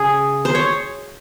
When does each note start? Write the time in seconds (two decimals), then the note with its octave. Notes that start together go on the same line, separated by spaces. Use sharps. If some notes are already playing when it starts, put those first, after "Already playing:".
Already playing: C#3 G#4
0.45 C5
0.55 C#5